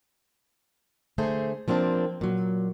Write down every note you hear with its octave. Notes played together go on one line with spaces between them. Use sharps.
D3 A3 G#4 C5
F3 A#3 C4 D4
A#2 F#3